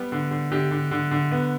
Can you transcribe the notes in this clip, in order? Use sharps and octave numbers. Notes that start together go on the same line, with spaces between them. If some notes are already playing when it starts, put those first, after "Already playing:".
Already playing: G3 B3 G4
D3
D3
D3 G4
D3
D3
D3
B3